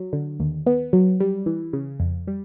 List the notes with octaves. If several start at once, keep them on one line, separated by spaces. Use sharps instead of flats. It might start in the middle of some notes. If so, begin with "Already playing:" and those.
Already playing: F#3
D3
D#2
B3
F#3
G3
E3
C#3
F2
G3